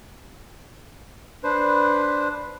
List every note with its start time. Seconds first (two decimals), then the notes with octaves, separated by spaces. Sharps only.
1.44 D4 B4 C5